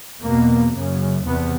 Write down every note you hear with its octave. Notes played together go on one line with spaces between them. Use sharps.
E2 B2 A#3
F#2 C#3
E2 C3 B3